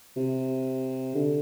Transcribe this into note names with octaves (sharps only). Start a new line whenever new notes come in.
C3
D3